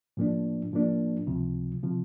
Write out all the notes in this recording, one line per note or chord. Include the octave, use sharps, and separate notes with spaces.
A2 F3 A#3 D4
A2 F3 A#3 D4
C#2 C3 F3
C3 F3